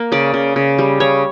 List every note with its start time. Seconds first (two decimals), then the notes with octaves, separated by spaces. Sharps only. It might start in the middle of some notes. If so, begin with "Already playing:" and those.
Already playing: A#3
0.12 C#3 D5
0.34 C#3
0.56 C#3
0.79 G3
1.00 C#3 C#5